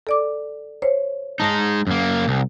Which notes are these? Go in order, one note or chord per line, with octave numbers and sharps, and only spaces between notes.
A4 D5 D6
C5 C#5
G#3 D#4 A5 A#6
F#2 A#3
C2